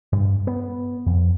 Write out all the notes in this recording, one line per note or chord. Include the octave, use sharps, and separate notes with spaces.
G2
B3
F2